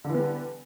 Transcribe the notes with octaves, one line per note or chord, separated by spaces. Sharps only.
D3 E3 G3 B3